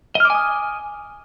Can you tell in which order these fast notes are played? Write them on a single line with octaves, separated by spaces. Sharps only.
D#5 F6 D6 G#5 D#6